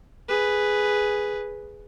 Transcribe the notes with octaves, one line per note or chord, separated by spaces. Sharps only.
G#4 B4